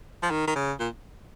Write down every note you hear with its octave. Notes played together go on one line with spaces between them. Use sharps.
F3
D#3
D#3
C#3
A#2